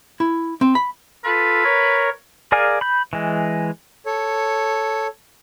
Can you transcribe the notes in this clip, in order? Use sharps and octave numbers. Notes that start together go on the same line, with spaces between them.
E4
C4
B5
F4 A4 B4
A#4 C#5
G#4 A#4 D5 F5 G#5
B5 G6
E3 G#3
A4 C#5